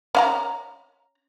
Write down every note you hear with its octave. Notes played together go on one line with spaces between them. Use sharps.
C#4 F5 A#5